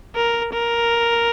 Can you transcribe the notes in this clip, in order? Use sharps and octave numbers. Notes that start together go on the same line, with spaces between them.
A#4
A#4